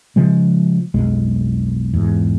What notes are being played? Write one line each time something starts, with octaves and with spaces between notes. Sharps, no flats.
C#3 F3 G#3
B1 F2 G#3
E2 G#2